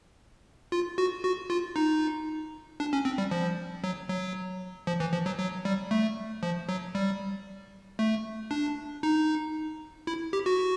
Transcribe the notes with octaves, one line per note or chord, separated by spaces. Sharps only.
F4
F#4
F#4
F4
D#4
D4
C#4
C4
G3
F3
F#3
F#3
F3
E3
F3
F#3
F#3
G3
A3
F3
F#3
G3
A3
D4
D#4
E4
G4
F#4